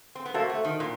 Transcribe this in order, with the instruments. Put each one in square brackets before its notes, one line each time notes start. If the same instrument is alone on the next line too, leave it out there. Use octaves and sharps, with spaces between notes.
[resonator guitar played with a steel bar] C4
B3
[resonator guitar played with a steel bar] A#3 [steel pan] F#4 A4 C5 E5 A5
[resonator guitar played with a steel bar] A3
D#3
A#2